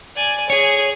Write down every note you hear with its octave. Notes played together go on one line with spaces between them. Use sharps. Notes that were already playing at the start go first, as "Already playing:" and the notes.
D5 G#5
G#4 C#5